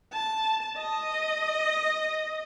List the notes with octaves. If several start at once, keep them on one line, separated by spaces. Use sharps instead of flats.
A5
D#5